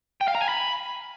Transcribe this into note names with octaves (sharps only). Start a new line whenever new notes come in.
G5
F5
A#5
G#5
B5